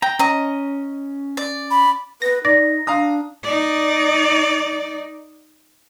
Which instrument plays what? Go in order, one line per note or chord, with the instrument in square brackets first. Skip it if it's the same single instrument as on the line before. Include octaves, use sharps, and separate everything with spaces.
[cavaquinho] G5 [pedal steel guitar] A#5
[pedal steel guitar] C#4 [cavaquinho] D#5 A#5
[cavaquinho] D5
[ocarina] B5
[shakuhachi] B4 [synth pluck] A#6
[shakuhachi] D#4 [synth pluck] D5 [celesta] A#6
[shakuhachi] D4 [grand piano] F5 A#5 D#6
[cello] D#4 D5